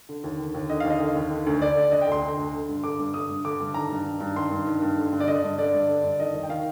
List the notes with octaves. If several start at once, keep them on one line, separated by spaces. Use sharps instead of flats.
D3
D#2
D3
D#2
D3 D#5
D#2 F5
D#5
D3
D#2
D3
D2
D3 D5
D2
D3 D#5
G5
D2
C6
D3
D2
D3
G2
D3 D6
G2
D3 D#6
G2
D3 D6
G2
D#3 A#5
G2
D#3
G2
D#3 C6
G2
D#3
G2
D3
G2
D5
D3 D#5
G2
D3 D5
G2
D3
G2
D#3 D#5
D#2
G5
D#3 F5